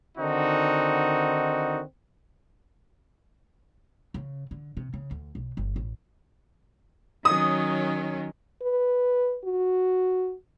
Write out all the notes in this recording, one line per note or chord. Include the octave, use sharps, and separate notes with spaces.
D3 D#3 C4 D#4 F#4
C#3
D3
C3
C#3
D2
B1
G1
A1
D#3 F#3 C#4 D#6
B4
F#4